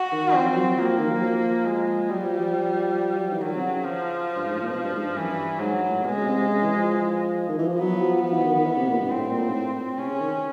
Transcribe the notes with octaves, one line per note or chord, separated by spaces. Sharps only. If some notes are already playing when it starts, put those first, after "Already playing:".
Already playing: F#4
D#3
F3 C4
F3
F#3
F3 A#3
D#3
F#3
F3
G#3
F#3 G3
F3
F3
F#3
F3
E3
D#3 F#3
C3
C#3
F3
G2
G#2
A2
A#2
B2
G2
G#2
G2
F#2 E3
G2
G#2 F#3
A2
B2 G#3
C#3
C3
C3
C#3
E3
F3
D#3
E3
F3
F#3 B3
F3
F3 B3
E3
D#3
D#3
E3
C3
A#2
G2
A2 C4
A#2
G#2
A2
C3 C#4
C#3
D#3